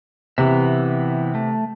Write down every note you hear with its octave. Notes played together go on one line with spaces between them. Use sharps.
C3 E3 B3 E5
A3